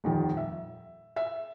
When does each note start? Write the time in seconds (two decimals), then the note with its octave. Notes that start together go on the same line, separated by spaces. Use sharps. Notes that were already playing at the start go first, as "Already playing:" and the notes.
0.04 D#1 F2 D#3
0.37 E5
1.16 E5